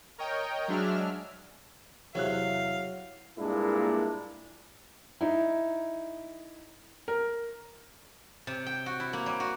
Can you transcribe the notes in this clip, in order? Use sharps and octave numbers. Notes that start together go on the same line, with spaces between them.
A#4 C#5 D#5 G5
F#3 G#3 D4 E5 F6
E2 C3 F#3 C#5 E5 F5 F#6
G2 A#2 G#3 A#3 D4 E4
D#4 E4
A#4
C3
G5
F#4
E4
A#3
G3
F#4